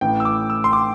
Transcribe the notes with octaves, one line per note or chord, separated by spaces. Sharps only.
A1 A2 E3 G5
E6
D6
E6
C6
D6